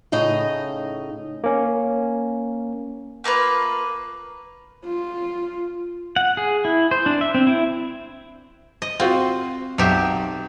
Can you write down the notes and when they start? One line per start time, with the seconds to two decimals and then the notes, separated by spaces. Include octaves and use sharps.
0.12 A2 C#3 D#4 D#5
1.44 A#3 C#4
3.24 A3 A#3 F4 B4
4.85 F4
6.16 F#5
6.37 G#4
6.65 E4
6.91 C5
7.06 D4
7.21 E5
7.35 C4
7.47 E4
8.82 D#5
9.00 C4 F4 F#4
9.78 B1 F#3 G4 E5